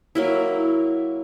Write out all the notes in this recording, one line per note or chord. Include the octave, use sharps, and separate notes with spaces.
F#3 A#3 E4